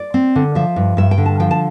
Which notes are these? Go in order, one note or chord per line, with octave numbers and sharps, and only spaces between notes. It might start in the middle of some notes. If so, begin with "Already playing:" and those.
Already playing: D5
C4
D3
F3 E5
G2
G2 E5
G5
D3
A5
F3 G5
A5